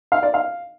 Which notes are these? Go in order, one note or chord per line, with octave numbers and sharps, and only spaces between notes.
F5
D5
F5